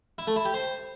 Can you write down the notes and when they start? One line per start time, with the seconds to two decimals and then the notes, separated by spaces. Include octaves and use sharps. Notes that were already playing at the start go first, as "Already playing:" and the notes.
0.18 E4
0.27 A3
0.36 E4
0.45 G4
0.54 C5